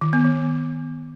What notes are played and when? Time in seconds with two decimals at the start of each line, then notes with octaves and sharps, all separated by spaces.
0.01 D#3
0.13 B3
0.25 D#3